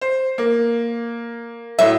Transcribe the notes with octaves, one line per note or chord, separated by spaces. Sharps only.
C5
A#3
A2 F#3 E5